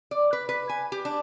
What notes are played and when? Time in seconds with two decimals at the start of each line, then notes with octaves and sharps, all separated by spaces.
0.11 D5
0.33 B4
0.49 B4
0.69 G#5
0.92 G4
1.05 D4